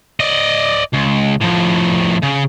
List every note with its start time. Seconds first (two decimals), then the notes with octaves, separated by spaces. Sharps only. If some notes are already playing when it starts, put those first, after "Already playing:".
0.20 D5 D#5
0.93 C#2
1.41 A2 F3
2.22 C#3